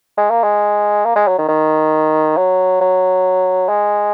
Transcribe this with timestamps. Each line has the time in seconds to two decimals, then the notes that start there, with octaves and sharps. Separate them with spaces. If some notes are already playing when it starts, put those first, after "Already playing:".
0.17 G#3
0.30 A#3
0.43 G#3
1.05 A#3
1.15 G#3
1.27 F#3
1.38 D#3
1.48 D#3
2.37 F#3
2.81 F#3
3.69 G#3